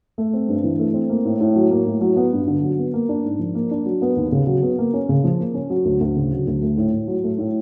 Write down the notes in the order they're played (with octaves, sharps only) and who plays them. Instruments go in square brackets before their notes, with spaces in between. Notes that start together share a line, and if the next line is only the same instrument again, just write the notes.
[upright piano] A3
C4
G2
E3
A3
C4
A#3
A2
A2
F#3
A#3
A2
F#3
B3
G2
D3
F#3
B3
A#3
D4
G#2
F3
A#3
D4
F#3
B3
D#2
C#3
F#3
B3
A#3
C#4
C#3
F3
A#3
C#4
F#3
D2
D2
C#3
F#3
D2
A3
A2
A2
F#3
A3
A2